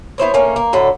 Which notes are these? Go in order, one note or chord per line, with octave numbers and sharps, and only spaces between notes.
B3 E4 C5 C#5
A3 A#3 C#4
A#3
A2 D3 F#3 A4